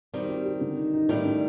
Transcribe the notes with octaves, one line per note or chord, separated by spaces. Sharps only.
D#3 G3 C4
G4
G4
D3
D#4
D#4
A2 D#3 G3
D4